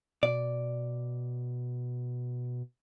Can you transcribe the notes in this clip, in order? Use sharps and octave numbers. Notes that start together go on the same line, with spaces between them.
B2 D5